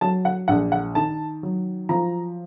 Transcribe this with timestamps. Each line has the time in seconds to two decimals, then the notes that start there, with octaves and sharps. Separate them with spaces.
0.01 F#3 A5
0.25 F#5
0.48 A#1 F#5
0.72 F#5
0.95 D#3 A5
1.43 F#3
1.89 F3 A#5